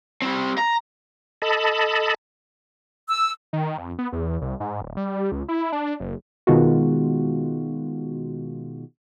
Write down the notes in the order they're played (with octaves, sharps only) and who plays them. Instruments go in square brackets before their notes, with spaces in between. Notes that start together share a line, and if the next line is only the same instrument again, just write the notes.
[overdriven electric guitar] G3 C4
A#5
[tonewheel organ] A4 D#5 A5 B5
[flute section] E6
[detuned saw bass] D#3
F2
B3
E2
C2
G#2
D1
G3
C#2
E4
D4
F#1
[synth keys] B2 D#3 G#3 F4 F#4